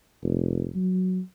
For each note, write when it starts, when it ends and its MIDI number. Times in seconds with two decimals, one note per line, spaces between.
0.23 0.69 29
0.75 1.20 54